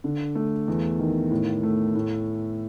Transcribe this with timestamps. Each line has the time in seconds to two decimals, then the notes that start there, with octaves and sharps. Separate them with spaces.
0.04 D3
0.35 A3
0.68 E2
0.99 D#3
1.31 A2
1.63 A3
1.95 A2